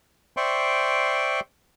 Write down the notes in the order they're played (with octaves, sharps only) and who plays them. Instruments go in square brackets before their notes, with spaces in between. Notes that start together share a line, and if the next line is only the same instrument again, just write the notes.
[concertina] C5 D5 E5 G5 C6 C#6